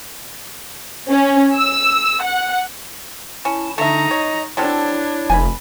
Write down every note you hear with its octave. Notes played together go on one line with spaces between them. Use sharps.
C#4
E6
F#5
C#4 E4 A5
D3 A3 D4 D#4 E5 A#5
C#5 D#5
F#3 C4 D4 E4 A4 C#5
F1 G#5 B5